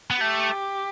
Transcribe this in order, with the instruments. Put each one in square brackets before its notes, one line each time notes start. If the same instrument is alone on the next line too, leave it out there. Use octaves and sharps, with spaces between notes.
[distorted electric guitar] B3
[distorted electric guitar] A3 [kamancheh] G4